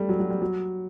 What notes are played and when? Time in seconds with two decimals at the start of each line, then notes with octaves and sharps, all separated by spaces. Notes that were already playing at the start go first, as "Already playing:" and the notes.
Already playing: G3 A3
0.09 F#3
0.20 F#3
0.30 G3
0.42 F#3